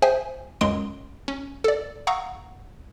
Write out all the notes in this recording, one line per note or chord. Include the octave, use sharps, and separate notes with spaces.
G#4 C5 E5 G5 G#5
C#2 F#2 G#3 C6 D#6 D7
C#4
A4 D5
F5 F#5 A#5 C#6 D#6 E6